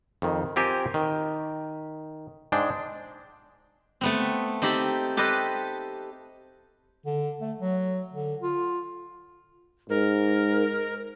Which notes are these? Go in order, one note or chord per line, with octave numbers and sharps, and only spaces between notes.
F2 D#3
C4 F4 G4 A#4 G#5
D#3
G#2 G#3 D4 G5
A3 B3 C4
C4 D#4 G4 A4 B5
G4 A4 B4 C5 D#5
D3
A3
F#3
D3
F4
G#2 A#4